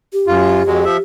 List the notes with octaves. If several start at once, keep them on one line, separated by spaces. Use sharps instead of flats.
G4
F#2 F4
F2 F#3 G#3
F3 E5